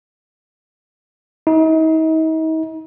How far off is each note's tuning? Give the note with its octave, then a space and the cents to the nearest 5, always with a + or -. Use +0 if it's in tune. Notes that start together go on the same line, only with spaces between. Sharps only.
D#4 +40